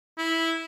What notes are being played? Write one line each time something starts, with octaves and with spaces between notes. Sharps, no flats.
E4